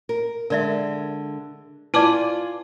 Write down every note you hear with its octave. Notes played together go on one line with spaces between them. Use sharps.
A#4
D3 G#3 A#4 D5 E5
E4 F4 B4 D5 G#5 A5 D6